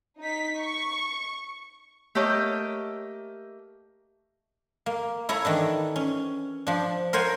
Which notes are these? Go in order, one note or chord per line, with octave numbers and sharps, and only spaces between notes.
D#4 B6
C#6
A3 A#3 G4 C#5 D#5
A#3
E4 A4 C#5 A#5
D#3 E3 D4
C#4
F3 D4
A#4 C5 C#5 F#5 G#5